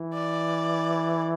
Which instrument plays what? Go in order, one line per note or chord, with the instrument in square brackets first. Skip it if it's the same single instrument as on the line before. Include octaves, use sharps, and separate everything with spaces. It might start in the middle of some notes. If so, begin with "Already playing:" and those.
Already playing: [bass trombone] E3
[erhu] D5